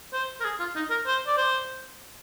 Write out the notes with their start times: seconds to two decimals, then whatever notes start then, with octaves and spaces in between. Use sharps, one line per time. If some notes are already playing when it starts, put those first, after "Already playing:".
0.13 C5
0.40 A#4
0.44 G#4
0.59 F4
0.75 D#4
0.90 A#4
1.06 C5
1.27 D5
1.37 C5